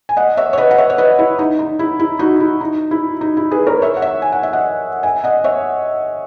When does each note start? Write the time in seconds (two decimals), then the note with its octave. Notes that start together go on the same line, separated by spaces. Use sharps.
0.09 G#5
0.17 D#5 F#5
0.37 C#5 E5
0.53 C#5
0.58 B4 D#5
0.71 F#5
0.78 C#5 E5
0.90 C#5
0.98 B4 D#5
1.19 E4
1.39 D#4
1.59 D#4
1.79 E4
2.00 E4
2.19 D#4 F#4
2.40 E4
2.61 D#4
2.91 E4
3.21 D#4
3.37 E4
3.51 G#4 B4
3.67 A#4 C#5
3.82 C#5 E5
3.97 F#5
4.02 C#5 E5
4.22 G#5
4.32 F#5
4.43 E5
4.53 D#5 F#5
5.03 E5 G#5
5.24 D#5 F#5
5.44 C#5 E5